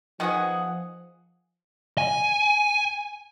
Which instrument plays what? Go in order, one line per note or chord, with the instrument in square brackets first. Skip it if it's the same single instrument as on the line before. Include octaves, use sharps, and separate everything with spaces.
[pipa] D#3 G#4 [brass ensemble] F3 [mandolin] B3 F#5 D#6
[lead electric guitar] G#5